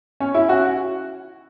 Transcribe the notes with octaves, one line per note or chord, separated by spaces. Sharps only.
C#4
E4
F#4